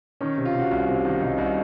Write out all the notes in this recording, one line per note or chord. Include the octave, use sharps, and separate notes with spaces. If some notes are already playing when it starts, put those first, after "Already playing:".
D#3 C#4
C3
F4
C3 F#4
C2
C3
D#3
C2 D#4
C2 D#4